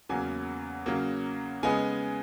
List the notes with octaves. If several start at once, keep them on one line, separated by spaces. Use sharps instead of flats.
E2 C#3 F#3 A#3 G#5
C#3 F#3 A#3
C#3 G#3 B3 D#4 G#5